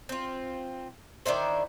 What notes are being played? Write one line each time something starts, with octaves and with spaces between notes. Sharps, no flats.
C4 F4
D#3 D4 E4 C5